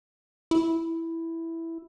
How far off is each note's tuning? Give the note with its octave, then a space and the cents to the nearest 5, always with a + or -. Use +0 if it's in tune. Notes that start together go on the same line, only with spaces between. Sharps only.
E4 +0